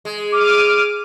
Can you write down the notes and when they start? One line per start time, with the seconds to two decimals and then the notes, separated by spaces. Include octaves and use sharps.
0.05 G#3
0.32 D6 F6 D#7